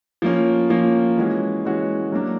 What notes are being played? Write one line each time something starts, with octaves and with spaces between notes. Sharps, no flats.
F3 A#3 C#4
F3 A#3 C#4
E3 G#3 C#4 F#4
E3 G#3 C#4 F#4
F#3 A#3 D4